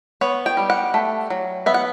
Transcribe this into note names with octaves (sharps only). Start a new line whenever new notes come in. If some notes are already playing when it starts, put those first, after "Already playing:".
B3 C#5
G5
G3
F#5
A3
F#3
B3 E5
F#5